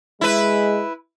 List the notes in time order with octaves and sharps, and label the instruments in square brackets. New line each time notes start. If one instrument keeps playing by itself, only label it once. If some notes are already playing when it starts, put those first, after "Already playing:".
[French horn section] G#3 [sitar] E4 B4